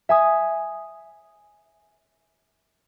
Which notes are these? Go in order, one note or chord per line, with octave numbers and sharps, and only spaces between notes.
E5 G#5 D#6